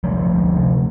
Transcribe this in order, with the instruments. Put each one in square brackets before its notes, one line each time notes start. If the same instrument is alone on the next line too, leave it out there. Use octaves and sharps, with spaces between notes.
[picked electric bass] D2 F3 A3
D2
C3